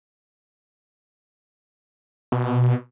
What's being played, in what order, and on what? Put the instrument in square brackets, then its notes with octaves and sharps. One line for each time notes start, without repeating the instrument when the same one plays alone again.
[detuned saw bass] B2